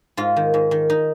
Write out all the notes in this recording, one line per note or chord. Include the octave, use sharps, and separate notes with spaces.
G#2 F4
D#3
G#2
D#3
D#4